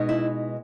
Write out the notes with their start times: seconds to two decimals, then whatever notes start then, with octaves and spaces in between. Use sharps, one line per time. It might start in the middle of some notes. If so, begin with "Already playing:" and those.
Already playing: B2 G#3 B3 D#4
0.09 E4